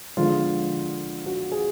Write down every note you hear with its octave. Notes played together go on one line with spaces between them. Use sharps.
D3 F3 G#3 F4
F#4
G#4